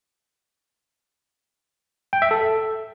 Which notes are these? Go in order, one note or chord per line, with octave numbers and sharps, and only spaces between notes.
G5
E5
A4